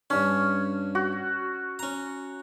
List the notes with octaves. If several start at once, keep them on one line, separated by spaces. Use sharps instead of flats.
G2 C#4 D4
F#4
C#4 A#5